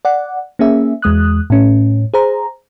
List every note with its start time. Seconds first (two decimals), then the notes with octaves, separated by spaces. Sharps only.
0.05 D5 F#5
0.59 A#3 C#4 G#4 E5
1.02 E2 G#3 D#6 F#6
1.50 A2 C#4
2.14 G#4 C5 A#5